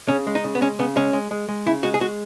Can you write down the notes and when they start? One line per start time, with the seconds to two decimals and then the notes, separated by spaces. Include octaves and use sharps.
0.08 C#3 C#4
0.27 G#3
0.35 D#4
0.44 C#3
0.55 B3
0.61 G#3 C#4
0.79 C#3 B3
0.96 G#3 C#4
1.13 G#3
1.31 G#3
1.49 G#3
1.66 C#3 E4
1.83 G#3 F#4
1.94 G#4
2.00 G#3 F#4